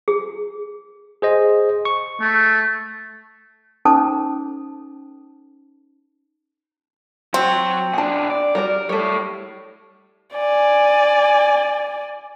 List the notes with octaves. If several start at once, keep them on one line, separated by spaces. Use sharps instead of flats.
G#4
G#4 C5 D#5
C#6
A3
C#4 D#4 A4 C5 A5 D6
F#3 C4 F#4
B2 D4 G#5 A5
D5
G3 F#4 A#4 D5
G3 A3 A4 C#5
D5 G#5